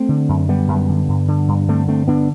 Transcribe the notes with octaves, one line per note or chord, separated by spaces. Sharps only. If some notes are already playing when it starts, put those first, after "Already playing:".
Already playing: A3 C4
D3
F#2
D3 G3 B3
F#2
D3
G2
D3
G2
D3 A3 C4
G2 A3 C4
D3 B3 D4